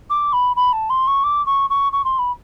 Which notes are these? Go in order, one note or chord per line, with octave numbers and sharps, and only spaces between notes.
D6
B5
B5
A5
C6
C#6
D6
C#6
C#6
C#6
C6
B5